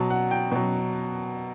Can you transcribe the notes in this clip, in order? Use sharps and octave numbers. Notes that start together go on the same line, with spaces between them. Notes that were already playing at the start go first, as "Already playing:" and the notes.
Already playing: B2 F#3 A5
F#5
G5
B2 F#3